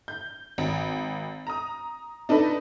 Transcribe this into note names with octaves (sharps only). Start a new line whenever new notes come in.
G6
G#1
A#5 D#6
D4 D#4 A4 B4